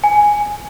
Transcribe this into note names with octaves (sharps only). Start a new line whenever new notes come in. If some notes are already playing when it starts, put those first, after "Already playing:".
G#5